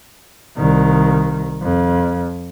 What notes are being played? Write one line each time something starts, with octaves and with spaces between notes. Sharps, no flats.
C2 D#3
F2